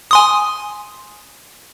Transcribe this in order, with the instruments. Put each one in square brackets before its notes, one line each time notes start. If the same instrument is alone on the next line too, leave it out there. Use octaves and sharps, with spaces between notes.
[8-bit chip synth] G#5 C6 D#6